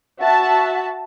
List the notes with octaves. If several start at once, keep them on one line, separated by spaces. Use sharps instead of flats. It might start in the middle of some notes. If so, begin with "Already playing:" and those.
F#4 E5 A5